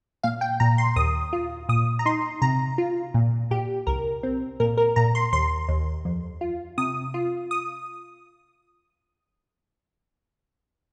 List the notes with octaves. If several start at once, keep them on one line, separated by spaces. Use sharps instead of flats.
A#2 F5
G5
A#2 A#5
C6
D#2 D#6
F4
A#2 D#6
A#5
D#4 C6
C3 A#5
F4
A#2
A#2 G4
C2 A#4
C4
A#2 A#4
A#4
A#2 A#5
C6
D#2 C6
D#2
F2
F4
C3 D#6
F4
D#6